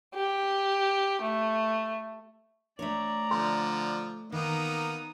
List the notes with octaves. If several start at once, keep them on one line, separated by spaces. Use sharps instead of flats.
G4
A3
A3 D4 C#5 D5 A#5
D3 F3 C6
D#3 A#3 B3 D#4 D#6